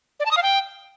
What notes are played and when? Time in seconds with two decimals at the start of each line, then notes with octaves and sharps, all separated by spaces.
0.20 D5
0.26 A5
0.31 D#6
0.37 F5
0.43 G5